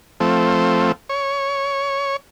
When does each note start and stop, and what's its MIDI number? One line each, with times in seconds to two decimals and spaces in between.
0.20 0.92 53
0.20 0.92 57
0.20 0.92 60
1.09 2.16 73